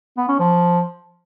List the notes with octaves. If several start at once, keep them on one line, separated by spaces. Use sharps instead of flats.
B3
C#4
F3